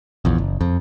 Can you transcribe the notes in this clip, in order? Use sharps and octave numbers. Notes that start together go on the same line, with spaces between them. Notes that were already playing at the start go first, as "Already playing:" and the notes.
A#1 E2
F#1
F2